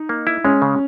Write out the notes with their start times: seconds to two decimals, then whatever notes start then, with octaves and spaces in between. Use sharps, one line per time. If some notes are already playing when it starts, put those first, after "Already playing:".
Already playing: D#4
0.09 A#3
0.27 E4
0.44 G#3 C#4
0.62 C#3